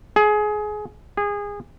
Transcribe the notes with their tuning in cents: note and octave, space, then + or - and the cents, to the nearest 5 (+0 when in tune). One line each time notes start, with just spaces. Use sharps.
G#4 +20
G#4 -25